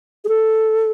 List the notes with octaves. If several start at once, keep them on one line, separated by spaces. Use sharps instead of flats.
G#4
A4